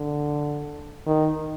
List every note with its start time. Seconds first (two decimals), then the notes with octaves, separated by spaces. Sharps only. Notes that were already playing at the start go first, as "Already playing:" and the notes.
Already playing: D3
1.07 D#3